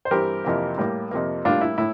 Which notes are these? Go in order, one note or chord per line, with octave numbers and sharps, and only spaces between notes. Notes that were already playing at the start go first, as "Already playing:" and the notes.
C5
G2 E3 G3 C4 G4 A#4
F2 C3 E3 A#3
A2 G3 A#3
F2 C3 F3 A#3
A2 G3 A#3 D4 F4
E4
A2 E4